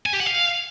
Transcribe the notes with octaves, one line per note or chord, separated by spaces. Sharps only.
G#5
G4
F#5
F5